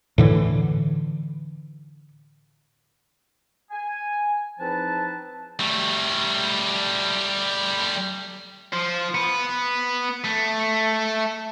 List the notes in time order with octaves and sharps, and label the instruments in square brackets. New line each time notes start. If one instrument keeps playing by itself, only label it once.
[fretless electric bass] A2 D3 E3
[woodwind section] G#5
E2 F3 C4 D#4 B4 A5
[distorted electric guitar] G3 A3
F3
B3
A3